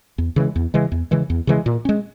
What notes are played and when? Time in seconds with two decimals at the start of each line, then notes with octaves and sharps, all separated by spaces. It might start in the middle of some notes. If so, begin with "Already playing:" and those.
0.18 E2
0.36 C#3 E3 G#3
0.56 E2
0.74 C#3 E3 G#3
0.92 E2
1.11 C#3 E3 G#3
1.30 E2
1.47 C#3 E3 G#3
1.66 A#2
1.85 G#3 C#4